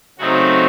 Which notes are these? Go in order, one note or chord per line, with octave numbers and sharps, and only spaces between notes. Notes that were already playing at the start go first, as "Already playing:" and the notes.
C#3 F#3 A3 C4 D#4 F#4